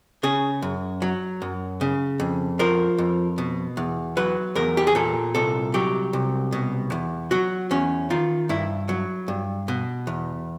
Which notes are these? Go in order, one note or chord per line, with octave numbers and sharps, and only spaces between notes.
C#3 G#4
F#2
F#3
F#2
C#3
F2
F3 A#4
F2
B2
E2
F#3 B4
E2 A#4
G4
G#4
A#2 A4
C2 A4
F#3 G4
C2
B2
E2
F#3 F#4
E2 C#4
D#3 F4
G2 E4
F#3
G2
B2
E2